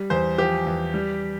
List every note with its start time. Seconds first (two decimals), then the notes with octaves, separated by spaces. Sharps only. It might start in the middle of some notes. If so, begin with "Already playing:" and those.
Already playing: G3
0.10 E2 C5
0.38 F3 G4
0.67 E2
0.94 G3